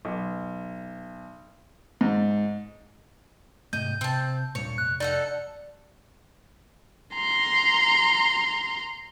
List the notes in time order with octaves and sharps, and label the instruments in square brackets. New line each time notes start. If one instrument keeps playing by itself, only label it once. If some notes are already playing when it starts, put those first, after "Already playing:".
[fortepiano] B1
G#2
[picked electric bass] G#2 C3 A3 [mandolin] D#5 [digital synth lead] G6
[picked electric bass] C3 [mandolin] C4 A5
[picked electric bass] D#1 G2 A#2 [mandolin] C#5
[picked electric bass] F1 [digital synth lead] F#6
[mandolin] D#4 A4 F#5 [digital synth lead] D5
[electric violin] A#5 C6